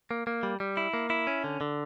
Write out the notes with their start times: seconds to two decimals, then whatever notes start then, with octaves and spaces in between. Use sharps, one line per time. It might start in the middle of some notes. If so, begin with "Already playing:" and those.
0.11 A#3
0.27 A#3
0.43 G3
0.60 G3
0.77 E4
0.94 A#3
1.10 E4
1.27 C#4
1.44 D3
1.61 D3